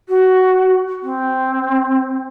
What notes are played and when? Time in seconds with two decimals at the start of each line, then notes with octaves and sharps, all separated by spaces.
0.09 F#4
1.03 C4